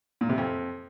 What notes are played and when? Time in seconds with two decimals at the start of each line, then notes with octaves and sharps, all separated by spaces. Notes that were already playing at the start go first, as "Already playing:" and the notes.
0.21 A#2
0.29 C3
0.38 F2